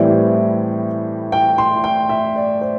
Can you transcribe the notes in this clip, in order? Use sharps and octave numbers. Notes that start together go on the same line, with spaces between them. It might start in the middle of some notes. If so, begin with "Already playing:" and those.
Already playing: A2 E3 G3 C4 D5
G5
C6
G5
E5
D5
C5